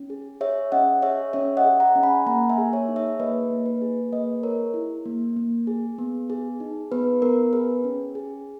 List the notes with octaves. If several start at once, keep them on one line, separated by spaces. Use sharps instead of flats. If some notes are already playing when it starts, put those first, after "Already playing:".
Already playing: C#4
G#4
G#4 C#5 E5
C#4 D#5 F#5
G#4 C#5 E5
C#4 C#5 E5
D#5 F#5
G#4
F#5 A#5
C#4
G#5 B5
A#3 F#5 A#5
E5 G#5
G#4
C#5 E5
D#4
C#5 E5
A#3 B4 D#5
A#3
B4
G#4
A#3 B4 D#5
G#4 A#4 C#5
E4
A#3
A#3
G#4
B3
G#4
D#4
B3 B4
B3 A#4
G#4 B4
C#4
G#4